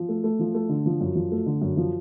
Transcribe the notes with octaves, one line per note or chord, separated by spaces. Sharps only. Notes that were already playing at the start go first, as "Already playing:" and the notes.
Already playing: F3
A3
A3
F3
A3
D3
F3
F#2
F3
A3
D3
F#2
F3